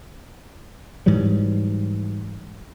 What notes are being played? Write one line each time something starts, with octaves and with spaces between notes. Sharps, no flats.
G#2 E3 F#3 G3